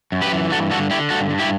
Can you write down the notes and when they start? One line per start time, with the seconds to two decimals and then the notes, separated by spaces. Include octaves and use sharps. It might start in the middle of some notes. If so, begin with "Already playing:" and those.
0.12 F#2
0.22 G4 B4
0.32 E3
0.52 G2 F#4 A4
0.71 D3 F#4 A4
0.90 D3 E4 G4
1.10 G2 F#4 A4
1.30 G2
1.39 E4 G4